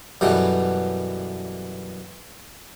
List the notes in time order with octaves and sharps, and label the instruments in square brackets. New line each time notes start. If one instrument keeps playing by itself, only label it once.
[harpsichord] F#2 B2 E3 G3 A3